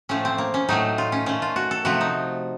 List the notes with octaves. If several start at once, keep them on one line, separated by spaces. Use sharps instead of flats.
A2 F3 A3 C#4
C4
A#3
C#4
A2 F#3 A3 D#4
F4
C#4
A#2 A3 C#4
F4
F#4
A4
C3 F3 A3 F#4
D#4